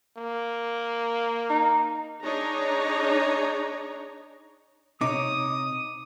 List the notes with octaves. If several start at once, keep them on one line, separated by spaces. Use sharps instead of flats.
A#3
D#4
D4 D#4 G#4 C#5 A#5
C3 D#4 C#5 D6 D#6